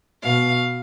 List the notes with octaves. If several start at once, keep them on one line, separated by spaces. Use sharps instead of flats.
B2 F5